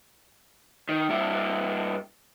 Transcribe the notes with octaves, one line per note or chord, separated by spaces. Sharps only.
D#3
G2 E4